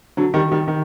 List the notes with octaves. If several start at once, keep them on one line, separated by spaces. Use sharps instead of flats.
D3 F#3
D#3 G3
D#3 G3
D#3